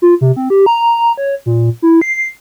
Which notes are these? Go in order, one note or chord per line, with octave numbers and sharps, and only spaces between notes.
F4
C3
C4
G4
A#5
C#5
A#2
E4
C7